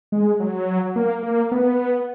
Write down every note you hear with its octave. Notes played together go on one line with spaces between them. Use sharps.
G#3
F#3
A#3
A#3
B3